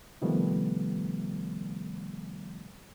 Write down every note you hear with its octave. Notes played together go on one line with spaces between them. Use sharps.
C3 D#3 F3 G3 A3 B3